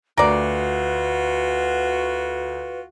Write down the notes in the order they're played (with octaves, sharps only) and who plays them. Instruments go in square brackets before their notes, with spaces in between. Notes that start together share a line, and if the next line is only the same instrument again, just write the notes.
[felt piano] D2 [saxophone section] F4 F#4 [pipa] A#4 D5 [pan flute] B4